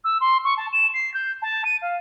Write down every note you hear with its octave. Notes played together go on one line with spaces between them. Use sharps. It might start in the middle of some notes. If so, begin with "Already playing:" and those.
E6
C6
C#6
A5
E7
C7
G6
A5
D#7
F5